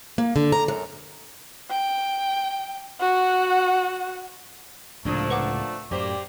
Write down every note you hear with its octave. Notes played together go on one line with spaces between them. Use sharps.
A#3
D3
A#5
F#2
G5
F#4 F#5
C#2 A2 C3 F3 A3 A#3 D4
B4 F#5 D6
F#2 A2 A#3 G4 C5 D5